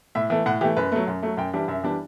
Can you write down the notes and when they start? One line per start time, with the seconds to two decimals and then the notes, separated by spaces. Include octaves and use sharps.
0.15 A2 E5
0.30 E3 A3
0.46 A2 F#5
0.61 E3 A3 G4
0.77 F#2 B4
0.92 F#3 A3
1.07 F#2
1.23 F#3 A3
1.37 F#2 G5
1.53 E3 G3 D4
1.68 F#2 E5
1.83 E3 G3 D4